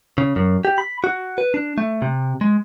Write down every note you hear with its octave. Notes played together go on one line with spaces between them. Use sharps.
C#3
F#2
G4
B5
F#4
B4
D4
A3
C3
G#3